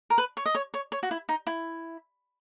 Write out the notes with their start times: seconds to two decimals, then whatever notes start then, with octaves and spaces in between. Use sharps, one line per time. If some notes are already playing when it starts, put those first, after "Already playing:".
0.10 A#4
0.18 B4
0.37 C#5
0.46 D#5
0.55 C#5
0.74 C#5
0.92 C#5
1.03 F#4
1.11 E4
1.29 D#4
1.47 E4